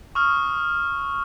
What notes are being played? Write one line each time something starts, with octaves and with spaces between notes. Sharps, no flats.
C#6 D#6 F6